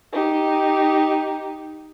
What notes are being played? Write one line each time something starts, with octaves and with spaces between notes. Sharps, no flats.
D#4 G4